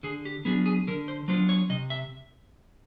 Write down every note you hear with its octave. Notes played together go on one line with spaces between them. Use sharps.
D3 G#4
G4
F#3 B3 D4 F4 G#4
G#4
D3 A#4
C5
F#3 B3 D4 F4 C5
C#5
C3 D#5
E5